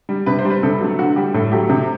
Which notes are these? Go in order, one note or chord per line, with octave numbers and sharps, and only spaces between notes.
G3
C3 B4
C5
G3
B4
C3 A4
F#3 A3
D3 F#4
G3 G4
A2 A4
F#3 A3 G4
C3